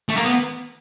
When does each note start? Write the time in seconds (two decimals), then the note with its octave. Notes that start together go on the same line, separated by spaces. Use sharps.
0.09 A3
0.17 A#3
0.25 B3